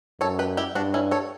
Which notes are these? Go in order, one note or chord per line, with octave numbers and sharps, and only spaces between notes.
F#2 A4 C#5
G4 B4
E4 G4
G2 D4 F#4
C#4 E4
A4 C#5